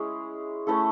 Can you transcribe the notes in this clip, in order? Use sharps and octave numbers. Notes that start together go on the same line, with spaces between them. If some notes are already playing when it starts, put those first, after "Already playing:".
Already playing: G#3 C#4 E4 G#4
A3 C#4 E4 A4